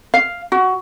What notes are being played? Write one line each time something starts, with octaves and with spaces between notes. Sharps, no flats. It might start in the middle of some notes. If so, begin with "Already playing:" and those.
F5
F#4